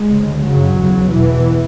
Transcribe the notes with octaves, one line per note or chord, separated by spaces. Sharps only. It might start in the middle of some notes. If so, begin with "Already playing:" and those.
Already playing: G#3
D2 C#3
F#2 C#3 F#3
E2 C#3
E2 B2 E3